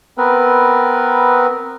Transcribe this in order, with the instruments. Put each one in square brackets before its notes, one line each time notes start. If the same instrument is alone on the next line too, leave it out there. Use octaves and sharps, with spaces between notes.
[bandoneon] B3 C4 A#4 B4